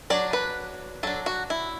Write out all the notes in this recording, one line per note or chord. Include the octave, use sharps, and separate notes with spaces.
F#3 D4 D5
B4
F#3 D4 A4
F#4
E4